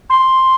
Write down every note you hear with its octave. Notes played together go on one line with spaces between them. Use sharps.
C6